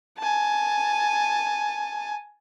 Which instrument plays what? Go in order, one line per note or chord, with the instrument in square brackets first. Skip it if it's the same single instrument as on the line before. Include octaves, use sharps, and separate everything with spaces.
[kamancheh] G#5 A5